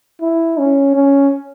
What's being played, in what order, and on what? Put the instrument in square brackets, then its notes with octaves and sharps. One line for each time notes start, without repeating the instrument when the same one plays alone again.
[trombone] E4
C#4
C#4